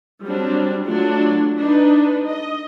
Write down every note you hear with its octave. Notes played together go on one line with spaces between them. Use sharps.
F#3 G3 C4 D4
F#3 A3 D4 F4
D4 D#4 B4
D#5